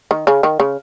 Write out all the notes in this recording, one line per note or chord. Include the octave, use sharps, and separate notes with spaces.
D#3
C#3
D#3
C#3